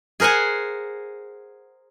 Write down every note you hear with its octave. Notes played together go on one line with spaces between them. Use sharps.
G#4 A#4 C5 F#5 G#5